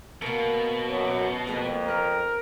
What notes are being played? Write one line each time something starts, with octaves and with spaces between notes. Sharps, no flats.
B2 A#3 A#4
F#2
F2 G#3 A#3 B3
A#4 B4